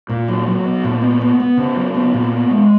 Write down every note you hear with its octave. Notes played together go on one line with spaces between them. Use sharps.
A#2
F#3
F#3
B3
A#2
B3
B3
B3
C#3
F#3
B3
A#2
B3
G#3